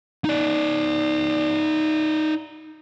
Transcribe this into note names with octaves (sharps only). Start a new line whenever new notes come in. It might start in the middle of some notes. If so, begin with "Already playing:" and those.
D#4 D5